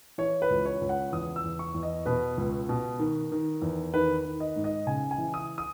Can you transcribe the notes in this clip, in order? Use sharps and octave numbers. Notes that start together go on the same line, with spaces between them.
E3 C#5
B4
C#2
C#5
C#2
F#5
E2 D#6
E6
E2
C#6
E2
D#5
B2 B4
C#2
B2
D#3
D#3
E2
D#3 B4
D#3
D#5
G#2
D#5
C#3 G#5
G#5
E3
D#6
D#6